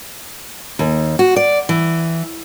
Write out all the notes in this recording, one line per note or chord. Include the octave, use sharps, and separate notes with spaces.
D#2
F#4
D5
E3